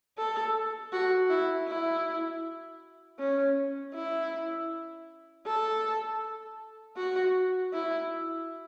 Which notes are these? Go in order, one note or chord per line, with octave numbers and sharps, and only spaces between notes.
A4
F#4
E4
E4
C#4
E4
A4
F#4
E4